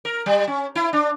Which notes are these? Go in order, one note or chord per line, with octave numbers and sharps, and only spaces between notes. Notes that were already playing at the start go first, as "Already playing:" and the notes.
A#4
G3
C#4
E4
D4